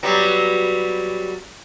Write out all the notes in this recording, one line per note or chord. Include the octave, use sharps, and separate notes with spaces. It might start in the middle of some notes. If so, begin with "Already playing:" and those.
F#3 G3 B3